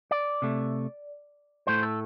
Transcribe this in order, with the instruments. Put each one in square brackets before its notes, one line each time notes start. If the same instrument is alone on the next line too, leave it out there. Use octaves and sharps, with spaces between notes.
[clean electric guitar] D5
C3 A3
A2 A3 C5
A4